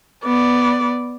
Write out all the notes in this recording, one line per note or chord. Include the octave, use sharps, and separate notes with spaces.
B3 D5